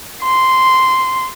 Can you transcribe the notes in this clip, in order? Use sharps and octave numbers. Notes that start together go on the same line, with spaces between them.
C6